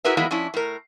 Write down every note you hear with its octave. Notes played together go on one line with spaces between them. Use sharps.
E4 F#4 G#4 A#4 B4 E5
E3 F#3 G#3 A#3 B3 E4
F3 C#4 D4 E4
A2 A#4